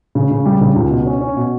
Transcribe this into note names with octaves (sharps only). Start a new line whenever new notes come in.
C#3
C#3
G3
C#3
C#2
B2
C#4
C#4
B2